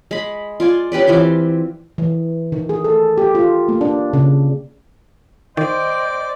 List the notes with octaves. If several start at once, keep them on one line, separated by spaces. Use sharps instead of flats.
G#3 B5
F4 D5 G#5
C#4 G4 B4 D5
E3 C4 F4 D6
E3
D#3
G#4
A4
G4
F4
A#3
D4
C#3
D#3 C5 D5 D#5 G5